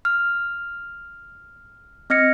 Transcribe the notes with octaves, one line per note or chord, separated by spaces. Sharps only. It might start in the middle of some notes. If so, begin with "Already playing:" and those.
F6
C4 D#5 F6 G#6 A#6 C#7